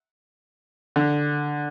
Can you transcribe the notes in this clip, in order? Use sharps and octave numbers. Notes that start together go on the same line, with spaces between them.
D3